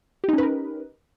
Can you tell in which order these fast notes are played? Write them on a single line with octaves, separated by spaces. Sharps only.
G4 D#4 C#4 B4 A#4